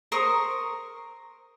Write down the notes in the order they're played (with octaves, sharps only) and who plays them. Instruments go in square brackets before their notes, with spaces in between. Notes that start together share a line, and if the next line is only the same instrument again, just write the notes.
[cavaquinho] A#4 C5 C#6 D#6